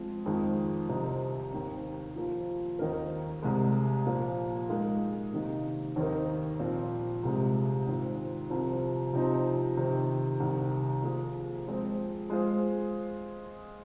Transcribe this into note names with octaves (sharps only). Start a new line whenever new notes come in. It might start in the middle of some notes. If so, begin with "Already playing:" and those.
Already playing: F3 G#3 C4
F2 D#3 G#3 F4
C2 C3 D#3 C4 D#4
D#2 D#3 C4
F3 A#3 F4
D#2 D#3 C4 D#4 A#4
C2 C3 G#3
A#2 F3 A#3 F4
G#3 D#4 A#4 F5
C3 D#3 A#3 D#4
D#2 D#3 C4 D#4 A#4
A#2 F3 C4 F4
C2 C3 G#3
G#2 D#3 C4 F4
C2 C3 F3 C4
C3 F3 C4 D#4 C5
C3 D#3 C4
C2 C3 D#3
F3 A#3 F4 G#4 C5
F3 G#3 C4 G#4
G#3 F4 G#4 C5